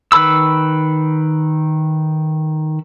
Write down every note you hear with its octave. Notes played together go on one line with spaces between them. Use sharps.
D#3 B4 B5 E6